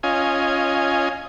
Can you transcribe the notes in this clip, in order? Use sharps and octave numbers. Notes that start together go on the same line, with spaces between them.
C#4 F4 D#5 G#5